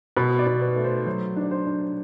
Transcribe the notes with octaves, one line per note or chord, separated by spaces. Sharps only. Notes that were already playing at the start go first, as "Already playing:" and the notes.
B2 B5
D5
B2
B4
A3
C5
F#3 C5
D4 D5
C5
D4